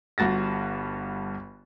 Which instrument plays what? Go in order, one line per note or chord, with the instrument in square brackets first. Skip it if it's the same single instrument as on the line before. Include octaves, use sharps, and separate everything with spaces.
[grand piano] G1 G2 F#4 A6 A#6